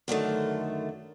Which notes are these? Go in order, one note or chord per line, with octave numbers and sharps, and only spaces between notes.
F#2 D3 D#3 A3